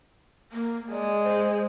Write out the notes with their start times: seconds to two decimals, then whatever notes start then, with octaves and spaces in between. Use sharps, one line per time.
0.52 A#3
0.91 G#3 D5
1.23 C5